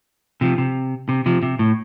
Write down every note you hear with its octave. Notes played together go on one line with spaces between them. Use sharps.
C3 F3
C3
C3
C3 F3
C3
A2